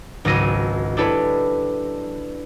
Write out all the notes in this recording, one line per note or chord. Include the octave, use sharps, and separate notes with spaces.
G#1 C#2 F#3 A#6 D#7
D4 E4 G4 A4 B4 C#5